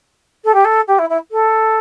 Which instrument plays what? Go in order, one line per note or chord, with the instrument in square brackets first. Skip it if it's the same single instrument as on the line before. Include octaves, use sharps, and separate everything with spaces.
[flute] A4
G4
A4
G4
E4
E4
A4